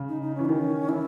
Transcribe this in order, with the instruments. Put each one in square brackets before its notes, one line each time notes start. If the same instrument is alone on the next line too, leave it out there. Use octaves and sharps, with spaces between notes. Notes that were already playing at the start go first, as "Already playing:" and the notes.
Already playing: [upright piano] C#3
[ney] D#4
D#4
[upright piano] E3 [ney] C#4
[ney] D#4
[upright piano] D#3 [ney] C#4
[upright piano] E3 [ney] E4